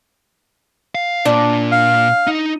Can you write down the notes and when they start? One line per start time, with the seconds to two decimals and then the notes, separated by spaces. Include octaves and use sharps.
0.95 F5
1.25 A#2 D4
1.72 F5
2.27 D#4